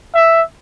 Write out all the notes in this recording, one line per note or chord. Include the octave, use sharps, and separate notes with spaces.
E5